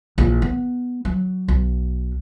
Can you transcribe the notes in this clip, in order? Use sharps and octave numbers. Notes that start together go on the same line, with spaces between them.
A#1 E3
B3
F#3
B1